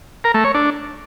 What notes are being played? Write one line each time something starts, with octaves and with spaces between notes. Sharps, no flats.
A#4
A3
C#5
D4